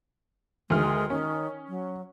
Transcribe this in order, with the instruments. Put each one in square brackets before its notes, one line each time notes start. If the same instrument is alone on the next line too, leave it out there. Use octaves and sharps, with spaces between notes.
[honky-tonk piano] D2 D#3 F6 [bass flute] G#3
[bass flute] D#3 [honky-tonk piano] C#4
[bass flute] F#3